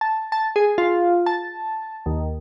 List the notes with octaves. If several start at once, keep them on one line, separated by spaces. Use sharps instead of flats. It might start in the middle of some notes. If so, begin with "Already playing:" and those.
A5
A5
G#4
F4
A5
D#2